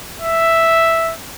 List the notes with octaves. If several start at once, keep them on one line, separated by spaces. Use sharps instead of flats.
E5